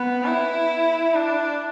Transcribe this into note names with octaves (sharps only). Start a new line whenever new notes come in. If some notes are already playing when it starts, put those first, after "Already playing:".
Already playing: B3
E4
D4